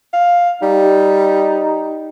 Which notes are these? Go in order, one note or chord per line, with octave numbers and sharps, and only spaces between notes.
F5
G3 D#4